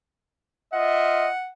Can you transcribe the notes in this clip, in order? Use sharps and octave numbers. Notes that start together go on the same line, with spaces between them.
F4 D#5 E5 F#5